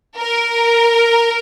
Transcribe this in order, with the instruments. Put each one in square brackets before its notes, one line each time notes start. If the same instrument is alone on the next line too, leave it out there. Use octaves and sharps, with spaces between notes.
[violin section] A#4